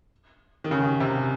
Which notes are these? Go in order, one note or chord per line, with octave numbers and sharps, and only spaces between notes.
D#3
C#3
C3